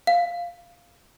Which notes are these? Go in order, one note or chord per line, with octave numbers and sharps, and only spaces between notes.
F5